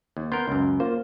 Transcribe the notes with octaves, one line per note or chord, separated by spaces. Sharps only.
D#2
B3 A#4 C6 G6
C#2 F#2
A#3 F4 C5